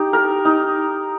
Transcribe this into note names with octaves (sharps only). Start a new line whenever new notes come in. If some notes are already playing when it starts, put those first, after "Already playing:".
Already playing: D#4 G4
A#4
D#4